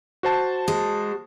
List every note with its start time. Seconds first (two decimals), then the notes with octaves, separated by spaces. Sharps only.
0.23 F#4 C5 A5
0.68 G#3